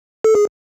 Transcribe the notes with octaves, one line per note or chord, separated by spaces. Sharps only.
A4
G#4